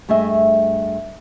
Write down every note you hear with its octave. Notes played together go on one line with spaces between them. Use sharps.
G2 A3 G#4 D#5 E5